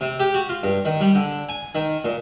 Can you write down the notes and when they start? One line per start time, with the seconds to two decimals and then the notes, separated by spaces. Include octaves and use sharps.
0.01 C3
0.20 G4
0.34 F#4
0.49 F4
0.63 G2
0.85 D#3
1.00 G3
1.15 D3
1.49 G#5
1.75 D#3
2.05 A#2